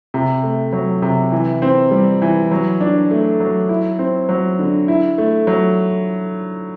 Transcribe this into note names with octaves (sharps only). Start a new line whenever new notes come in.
C3
A3
F#3
C3
E3
C4
G3
E3
F#3
D4
A3
F#3
E4
C4
F#3
D3
E4
A3
F#3